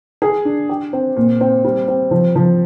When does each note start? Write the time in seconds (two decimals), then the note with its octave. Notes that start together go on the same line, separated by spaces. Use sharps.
0.22 G#4
0.45 D4
0.69 G4
0.93 C4
1.17 A#2
1.41 C4
1.65 G3
1.88 C4
2.11 F3
2.35 F3